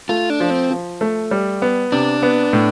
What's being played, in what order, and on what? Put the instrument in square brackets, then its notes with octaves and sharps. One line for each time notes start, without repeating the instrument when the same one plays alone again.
[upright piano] A3 [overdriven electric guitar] F4
[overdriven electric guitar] D4
[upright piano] F3
[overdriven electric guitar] C4
[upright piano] F3
A3
G3
B3
[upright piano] C3 [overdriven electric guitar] D4
[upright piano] B3
A2